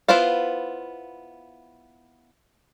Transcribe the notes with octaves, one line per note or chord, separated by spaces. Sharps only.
B3 E4 F4 C5 F5